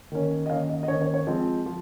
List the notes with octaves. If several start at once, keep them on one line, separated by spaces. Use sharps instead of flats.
D#3 A#3 C#4
D#5
D#3 A#3 C#4 F5
D#5
D#5
D#3 A#3 C#4 C#5
C#5
C#5
F3 G#3 C4 D#5
F3